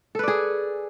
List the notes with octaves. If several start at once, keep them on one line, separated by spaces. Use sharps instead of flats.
G#4 A4 B4 D5